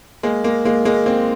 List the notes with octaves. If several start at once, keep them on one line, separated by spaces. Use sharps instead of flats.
G#3 A#3
G#3 A#3
G#3 A#3
G#3 A#3
A#3 C4